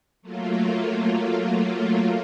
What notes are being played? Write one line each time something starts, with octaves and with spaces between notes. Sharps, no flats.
F#3 A3 A#3 F4